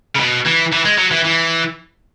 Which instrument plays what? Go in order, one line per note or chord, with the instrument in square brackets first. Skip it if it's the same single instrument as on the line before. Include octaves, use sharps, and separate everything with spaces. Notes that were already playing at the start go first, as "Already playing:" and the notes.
[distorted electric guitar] C#3
B2
E3
E3
G#3
F#3
E3
E3